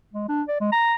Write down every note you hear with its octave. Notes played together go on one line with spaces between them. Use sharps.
G#3
D4
D5
G#3
A#5